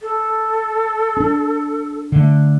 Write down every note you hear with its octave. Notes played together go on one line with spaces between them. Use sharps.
A4
C#4 D4
D3 A3